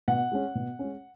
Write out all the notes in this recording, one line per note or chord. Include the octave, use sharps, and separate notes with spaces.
B2 F#5
G#3 C#4
B2
G#3 C#4